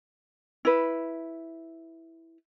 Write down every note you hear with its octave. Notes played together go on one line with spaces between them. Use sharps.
E4 B4